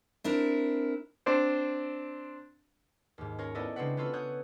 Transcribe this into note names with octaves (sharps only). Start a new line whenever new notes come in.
C4 D4 E4 A#4
C4 D4 C5
D#2 G#2
C#4 F4 A#4 C#5
B3 E4 A4 D5 D#5
C#3 G#3 C4 D4 B4 F#5
B3 C#4 F4 A4 B4
C#5 F#5 D#6 F#6 G6